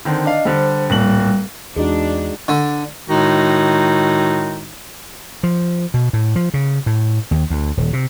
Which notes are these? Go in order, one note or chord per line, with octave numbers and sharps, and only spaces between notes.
D3 D#3 C4
D4 D#5 F5
D3 G3 C5
D1 A#1 G3 F#7
E2 G#3 D4 D#4 F#4
D3
A2 D#3 G#3 D#4 F#4
F3
B2
A2
F3
C#3
A2
D#2
D2
D#1
C3